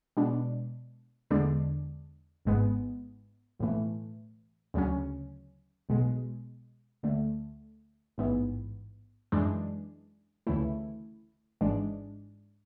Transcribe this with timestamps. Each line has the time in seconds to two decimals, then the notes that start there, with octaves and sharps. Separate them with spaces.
0.17 B2 G#3 D4
1.30 E2 D3 G#3 D4
2.45 G#1 G#2 G#3 B3
3.59 B1 A2 E3 A3
4.74 D2 C#3 F#3 C#4
5.89 B1 B2 G#3
7.03 D2 D3 A3
8.18 A1 G#2 E3 B3
9.32 F#2 E3 G#3 D4
10.47 D2 C#3 E3 A3 E4
11.61 G#1 G#2 E3 G#3 D4